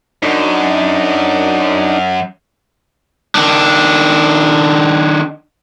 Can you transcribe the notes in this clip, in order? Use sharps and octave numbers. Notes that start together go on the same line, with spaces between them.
F#2 D4 D#4
D#3 D4